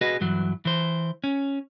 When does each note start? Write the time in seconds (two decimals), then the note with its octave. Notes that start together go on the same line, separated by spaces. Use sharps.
0.01 F#4 G#4 B4 D#5
0.21 G2 E3 F#3
0.65 E3 C5
1.24 C#4